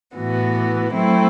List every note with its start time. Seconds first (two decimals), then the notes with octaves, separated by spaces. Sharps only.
0.15 A2 E3 B3 F#4
0.93 F#3 A3 C4 E4